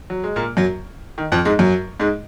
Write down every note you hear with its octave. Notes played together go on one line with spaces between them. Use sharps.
F#3
G#3
A#2 A#3
F#2 F#3
D#3
F2 F3
G#2 G#3
F#2 F#3
G#2 G#3